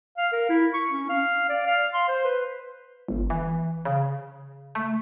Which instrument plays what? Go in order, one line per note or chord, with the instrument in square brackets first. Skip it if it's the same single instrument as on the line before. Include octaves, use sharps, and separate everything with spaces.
[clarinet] F5
A#4
E4
C#6
C#4
F5
D5
F5
C6
C5
B4
[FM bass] G1
E3
C#3
A3